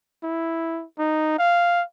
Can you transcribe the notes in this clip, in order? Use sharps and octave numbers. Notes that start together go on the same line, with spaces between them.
E4
D#4
F5